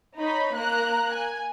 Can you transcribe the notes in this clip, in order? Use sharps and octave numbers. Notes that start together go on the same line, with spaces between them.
D#4 C#5 B5
A#3 A#5 F#6
G#5